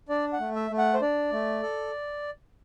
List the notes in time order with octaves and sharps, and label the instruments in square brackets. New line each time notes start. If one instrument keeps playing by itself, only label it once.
[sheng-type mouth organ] D4 D5
F#5
A3
E5
A3
F#5
C5
D4 D5
A3
A4